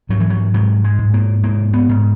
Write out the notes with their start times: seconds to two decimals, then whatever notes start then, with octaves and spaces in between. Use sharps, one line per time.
0.09 G#2 F#3
0.20 E3
0.30 F#3
0.54 G#2 F#3
0.84 G#3
0.99 G#2
1.14 A#3
1.43 G#2 A#3
1.73 B3
1.89 G#2